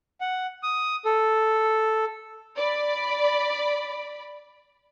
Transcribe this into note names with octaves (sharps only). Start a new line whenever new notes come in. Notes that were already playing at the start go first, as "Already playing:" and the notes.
F#5
D#6
A4
D5 B5